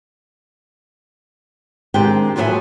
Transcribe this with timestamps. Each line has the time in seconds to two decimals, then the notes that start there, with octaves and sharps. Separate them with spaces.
1.94 D#3 G#3 C4 D4 G4 G5
2.36 A#2 F3 F#3 B4 E5 G#5